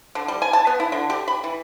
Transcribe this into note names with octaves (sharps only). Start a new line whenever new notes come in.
D3
G3
G#5
A5
B3
E4
D3
G4
B5
E3